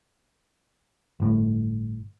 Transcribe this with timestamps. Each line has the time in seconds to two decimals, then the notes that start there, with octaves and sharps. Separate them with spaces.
1.20 G1 A2